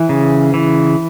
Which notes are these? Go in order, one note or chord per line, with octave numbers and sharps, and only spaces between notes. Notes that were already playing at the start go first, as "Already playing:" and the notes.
Already playing: E3
C#3
E3